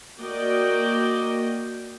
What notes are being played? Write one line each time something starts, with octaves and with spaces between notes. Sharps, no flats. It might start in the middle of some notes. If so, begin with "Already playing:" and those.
A#3 F#4 D5 D#5 G5